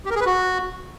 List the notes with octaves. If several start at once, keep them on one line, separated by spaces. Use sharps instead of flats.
G4
A#4
G#4
B4
F#4